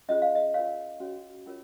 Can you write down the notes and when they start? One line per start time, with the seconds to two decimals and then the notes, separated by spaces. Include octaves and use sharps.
0.09 C#4 F4 G#4 C5 D#5
0.22 F5
0.35 D#5
0.54 F4 A#4 C#5 F5
1.00 C#4 F#4 C#5
1.46 C#4 F4 A#4 C#5